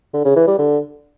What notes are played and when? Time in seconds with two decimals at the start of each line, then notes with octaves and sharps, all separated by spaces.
0.14 D3
0.25 C#3
0.36 E3
0.47 G3
0.58 D3